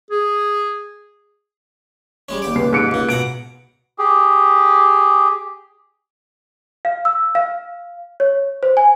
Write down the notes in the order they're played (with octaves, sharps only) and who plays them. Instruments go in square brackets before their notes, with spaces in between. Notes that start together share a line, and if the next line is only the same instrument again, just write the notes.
[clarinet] G#4
[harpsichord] G3 G#3 C#4
D#2 G4 D5
[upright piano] C#2 C7
G#2 C#7 D7
[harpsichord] C#2 A#3
[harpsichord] B2 F#5 A#5 [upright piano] D7
[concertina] G4 G#4
[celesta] F5
E6
F5
C#5
C5
G#5